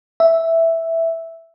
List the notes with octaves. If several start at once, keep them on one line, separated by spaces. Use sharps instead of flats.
E5